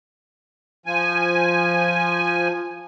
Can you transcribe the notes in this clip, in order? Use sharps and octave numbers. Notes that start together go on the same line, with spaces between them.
F3 G#5